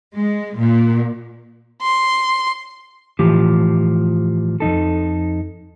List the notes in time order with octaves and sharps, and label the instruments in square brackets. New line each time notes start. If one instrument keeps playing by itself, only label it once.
[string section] G#3
A#2
[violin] C6
[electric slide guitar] A2 E3 F3 G4
F2 G#2 D#4 A4